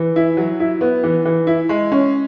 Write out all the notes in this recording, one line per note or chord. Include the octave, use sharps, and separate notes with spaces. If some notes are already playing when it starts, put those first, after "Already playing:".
Already playing: E3
E4
F#3
E4
B3
E3
E3
E4
G#3
C#4